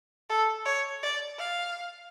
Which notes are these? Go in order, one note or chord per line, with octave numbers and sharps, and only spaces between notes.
A4
C#5
D5
F5